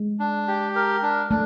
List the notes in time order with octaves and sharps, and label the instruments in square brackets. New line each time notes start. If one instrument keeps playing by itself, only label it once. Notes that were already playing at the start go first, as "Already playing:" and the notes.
Already playing: [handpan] G#3
[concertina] D4
G4
A#4
D4
[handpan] A3 [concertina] D4